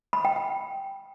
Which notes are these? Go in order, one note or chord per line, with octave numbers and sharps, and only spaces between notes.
B5
G5
G5